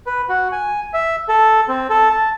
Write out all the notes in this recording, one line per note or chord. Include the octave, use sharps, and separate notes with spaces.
B4
F#4
G#5
E5
A4
C4
A4
A5